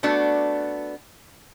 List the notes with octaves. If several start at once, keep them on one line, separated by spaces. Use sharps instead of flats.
A3 B3 D4 F#4